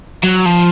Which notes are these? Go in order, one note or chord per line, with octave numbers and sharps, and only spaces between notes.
F#3
F3